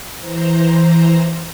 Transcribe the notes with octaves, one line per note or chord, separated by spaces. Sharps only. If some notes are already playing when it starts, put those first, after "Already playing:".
E3 C5 A#5